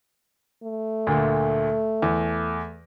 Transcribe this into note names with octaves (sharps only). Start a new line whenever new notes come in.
A3
D2 A#2
E2